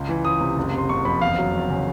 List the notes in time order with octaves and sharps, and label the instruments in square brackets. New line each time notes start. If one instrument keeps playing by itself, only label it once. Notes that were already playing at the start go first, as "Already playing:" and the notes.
Already playing: [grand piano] C#2
E3
C#2 D#6
C3
F#1
C3 C6
F#1 C#6
F2 B5
E2 F5
F#3
E2
C#3